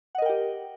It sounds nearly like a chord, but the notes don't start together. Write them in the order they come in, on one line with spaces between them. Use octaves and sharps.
F#5 D#5 A#4 G5 G4